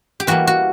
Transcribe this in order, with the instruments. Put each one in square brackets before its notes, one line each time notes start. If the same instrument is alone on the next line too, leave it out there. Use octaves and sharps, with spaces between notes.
[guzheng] G4
E3 G3 A#3 F#4
F#4